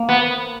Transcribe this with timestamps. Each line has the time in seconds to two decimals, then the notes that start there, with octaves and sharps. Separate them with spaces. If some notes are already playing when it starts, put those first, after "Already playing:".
Already playing: A#3
0.09 B3